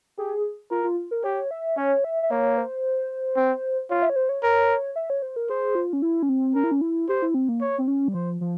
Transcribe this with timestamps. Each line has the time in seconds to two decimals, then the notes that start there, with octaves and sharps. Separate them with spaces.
0.18 G4 G#4
0.71 F4 A#4
0.84 F4
1.11 A#4
1.24 G4 C#5
1.51 E5
1.77 C#4 C#5
2.04 E5
2.23 E5
2.31 A#3 C#5
2.58 C5
3.36 C4
3.90 F4 C#5
4.03 E5
4.10 C#5
4.16 C5
4.29 C#5
4.43 A#4 C#5
4.96 E5
5.10 C#5
5.22 C5
5.36 A#4
5.50 G#4 C5
5.75 F4
5.93 C#4
6.02 E4
6.23 C#4
6.29 C4
6.55 C#4 A#4
6.64 E4
6.71 C#4
6.81 E4
7.09 G4 C5
7.22 E4
7.34 C4
7.49 A#3
7.61 C#5
7.78 C4
7.88 C#4
8.08 G3
8.14 F3 C5
8.41 F3